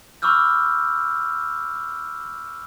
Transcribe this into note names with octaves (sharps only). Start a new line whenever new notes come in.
B5 C#6 D6 E6 F6 G6